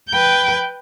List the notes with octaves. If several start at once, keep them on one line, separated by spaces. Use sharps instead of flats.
B4 G5